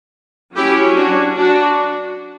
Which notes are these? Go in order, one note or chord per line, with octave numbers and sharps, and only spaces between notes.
F#3 C#4 E4 G4
D4 F#4
D4 F#4